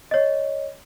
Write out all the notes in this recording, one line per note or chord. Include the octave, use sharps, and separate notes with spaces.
C#5 D#5